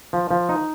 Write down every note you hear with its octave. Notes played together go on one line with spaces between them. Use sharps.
F3
F3
D#4